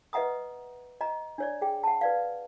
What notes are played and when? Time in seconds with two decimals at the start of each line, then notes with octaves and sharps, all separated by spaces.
0.13 B4 D#5 E5 F#5 A#5 D#6
1.01 D#5 A#5
1.38 D4 C#5 D5
1.62 G#4 G5
1.84 F#5 A5
2.01 B4 D5 F5